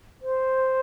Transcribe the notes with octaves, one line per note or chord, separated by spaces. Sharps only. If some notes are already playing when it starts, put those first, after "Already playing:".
C5